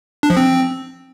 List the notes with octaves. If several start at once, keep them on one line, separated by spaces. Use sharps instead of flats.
D4
F3
C4